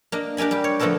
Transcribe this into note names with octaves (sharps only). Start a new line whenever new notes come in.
A#3 D4 D#5
D4 G4 A#4 G#5 B5
G3 G4
C#5
D3 F3 A3 B3 A4 A#4